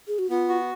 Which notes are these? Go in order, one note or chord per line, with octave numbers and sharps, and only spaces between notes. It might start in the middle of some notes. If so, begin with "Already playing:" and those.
G#4
F#4
B3 F4
F#4